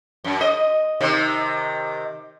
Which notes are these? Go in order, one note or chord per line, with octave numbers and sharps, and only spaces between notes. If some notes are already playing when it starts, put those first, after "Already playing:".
F#2
D#5
C3 D#3